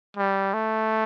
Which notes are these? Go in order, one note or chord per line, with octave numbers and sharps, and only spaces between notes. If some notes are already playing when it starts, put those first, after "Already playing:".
G3
A3